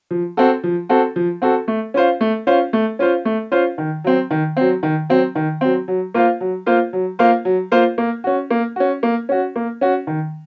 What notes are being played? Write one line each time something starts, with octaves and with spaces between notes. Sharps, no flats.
F3
C4 F#4 A4
F3
C4 F#4 A4
F3
C4 F#4 A4
A3
C#4 F4 C5 F5
A3
C#4 F4 C5 F5
A3
C#4 F4 C5 F5
A3
C#4 F4 C5 F5
D#3
F#3 C4
D#3
F#3 C4
D#3
F#3 C4
D#3
F#3 C4
F#3
A#3 F4 C5 F5
F#3
A#3 F4 C5 F5
F#3
A#3 F4 C5 F5
F#3
A#3 F4 C5 F5
A#3
C#4 F#4
A#3
C#4 F#4
A#3
C#4 F#4
A#3
C#4 F#4
D#3